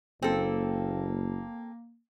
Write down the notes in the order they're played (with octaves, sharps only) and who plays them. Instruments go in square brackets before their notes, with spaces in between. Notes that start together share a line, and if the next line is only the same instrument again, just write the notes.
[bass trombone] F#1 [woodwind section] A#3 [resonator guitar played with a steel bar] C4 A4